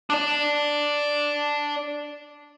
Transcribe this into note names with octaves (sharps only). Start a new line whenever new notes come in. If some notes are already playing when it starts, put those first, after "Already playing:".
D4 D5